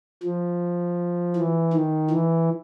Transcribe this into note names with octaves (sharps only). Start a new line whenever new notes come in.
F3
E3
D#3
E3